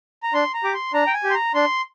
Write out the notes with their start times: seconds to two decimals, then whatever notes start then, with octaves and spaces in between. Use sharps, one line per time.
0.23 A#5
0.33 D4 C6
0.54 A#5
0.64 G4 D6
0.74 C6
0.93 D4 A#5
1.07 G5
1.14 G#5
1.24 G4
1.30 C6
1.34 A#5
1.54 D4 C6